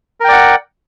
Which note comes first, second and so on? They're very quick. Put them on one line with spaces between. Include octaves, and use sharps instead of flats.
A#4 G5 D5 F#5